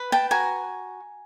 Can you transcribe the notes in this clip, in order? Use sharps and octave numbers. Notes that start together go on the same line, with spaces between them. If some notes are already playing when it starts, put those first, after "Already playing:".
Already playing: B4
G5 A5
F#4 G#5 A#5